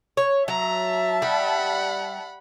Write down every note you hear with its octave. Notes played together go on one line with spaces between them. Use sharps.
C#5
F#3 E5 A5 A#5
G3 F#5 B5